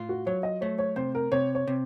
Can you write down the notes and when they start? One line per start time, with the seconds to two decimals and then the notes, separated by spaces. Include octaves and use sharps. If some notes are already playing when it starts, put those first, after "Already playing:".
Already playing: A2 F4
0.09 F#4
0.26 F#3 C#5
0.43 D#5
0.61 A3 C#5
0.78 C#5
0.96 C3 C5
1.15 A#4
1.32 C3 C#5
1.55 C#5
1.67 C3